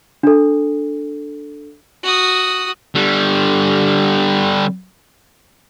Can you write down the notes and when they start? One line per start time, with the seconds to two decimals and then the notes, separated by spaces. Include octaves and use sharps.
0.23 D4 A4
2.03 F#4 D#6
2.95 D3 G3